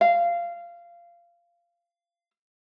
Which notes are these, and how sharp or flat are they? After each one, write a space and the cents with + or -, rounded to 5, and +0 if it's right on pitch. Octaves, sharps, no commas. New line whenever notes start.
F5 -20